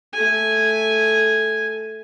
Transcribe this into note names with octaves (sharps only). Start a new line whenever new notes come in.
A3 G#5